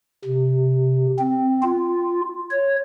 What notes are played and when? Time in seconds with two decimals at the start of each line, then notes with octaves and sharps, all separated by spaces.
0.25 C3
1.19 C4
1.63 F4
2.50 C#5